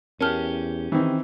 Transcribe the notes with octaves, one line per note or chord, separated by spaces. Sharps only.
E2 C#4 G4 A#4 A5 F6
D#3 E3 C4